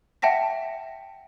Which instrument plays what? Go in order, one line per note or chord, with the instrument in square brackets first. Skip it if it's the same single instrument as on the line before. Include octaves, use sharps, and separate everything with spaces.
[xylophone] E5 F#5 G5 A5 A#6 B6